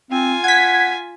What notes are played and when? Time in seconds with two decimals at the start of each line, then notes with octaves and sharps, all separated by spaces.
0.11 C4 F4 G#5
0.44 F#5 G#6 B6